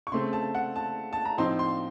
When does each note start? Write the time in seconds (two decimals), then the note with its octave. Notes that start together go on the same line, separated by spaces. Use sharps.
0.07 C#6
0.12 C#3 A3 C4 C6
0.33 A5
0.55 F#5
0.76 A5
1.13 A5
1.25 A#5
1.38 A2 F3 C4 D#4 C6
1.59 C6